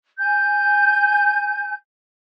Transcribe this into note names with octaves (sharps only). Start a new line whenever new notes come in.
G#5 G6